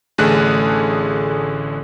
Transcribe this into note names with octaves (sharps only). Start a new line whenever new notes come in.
A1 D3 A3 G#4 F#6